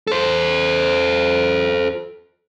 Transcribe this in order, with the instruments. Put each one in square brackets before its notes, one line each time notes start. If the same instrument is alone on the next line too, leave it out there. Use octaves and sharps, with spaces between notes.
[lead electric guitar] A4 C5